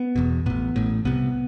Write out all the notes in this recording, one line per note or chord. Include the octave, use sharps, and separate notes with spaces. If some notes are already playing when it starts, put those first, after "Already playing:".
Already playing: B3
E1 E2 B2
A1 A2 B3
A1 A2
C2 C3 B3